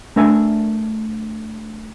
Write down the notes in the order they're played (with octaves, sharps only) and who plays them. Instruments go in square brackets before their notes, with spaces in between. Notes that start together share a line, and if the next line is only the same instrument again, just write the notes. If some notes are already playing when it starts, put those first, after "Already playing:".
[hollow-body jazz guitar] A3 D4 A#4 E5 G#5